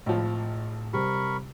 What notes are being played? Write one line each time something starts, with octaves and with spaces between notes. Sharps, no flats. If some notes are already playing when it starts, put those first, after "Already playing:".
G#1 A2 F3
C3 G3 G4 A#4 B5 C#6